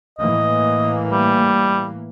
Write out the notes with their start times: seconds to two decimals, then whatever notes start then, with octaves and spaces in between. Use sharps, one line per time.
0.19 A2 E3 A#3 D#5
1.10 G3